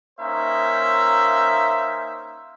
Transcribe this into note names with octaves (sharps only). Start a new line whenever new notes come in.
A#3 C#4 D#4 C5 E5